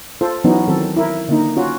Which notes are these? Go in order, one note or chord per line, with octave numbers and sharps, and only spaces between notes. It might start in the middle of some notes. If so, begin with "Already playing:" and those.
F4 A4 C5
E3 F#3 B3 C#4 D#4
D#3 F#3 C4 A4
E4 A#4
D3 A#3 D#4
C#4 F4 F#4